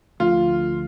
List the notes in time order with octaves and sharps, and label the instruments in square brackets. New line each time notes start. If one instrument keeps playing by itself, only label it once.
[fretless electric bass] D2 D3 F3 A3 [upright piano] F4